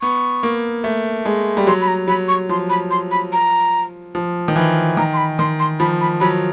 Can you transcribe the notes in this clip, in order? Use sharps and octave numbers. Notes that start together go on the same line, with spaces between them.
B3 C#6
A#3
A3
G#3
G3
F#3 C6
B5
A#5
F#3 B5
C#6
F3 C6
B5
C6
B5
A#5
F3
D#3
E3
D#3 A#5
C6
B5
D#3 C6
C6
F3 B5
B5
F#3 B5